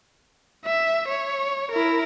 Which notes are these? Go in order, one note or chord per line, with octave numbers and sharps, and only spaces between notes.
E5
C#5
E4 A#4